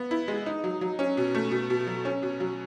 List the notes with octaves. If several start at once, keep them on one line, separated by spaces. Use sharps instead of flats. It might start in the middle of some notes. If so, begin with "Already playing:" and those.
Already playing: B3
E4
G#3
D#4
F#3
F#3
C#4
B2
A3
B2
B2
F#3
C#4
B2
F#3